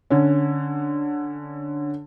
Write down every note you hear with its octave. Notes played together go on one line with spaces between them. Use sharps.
D3 C#4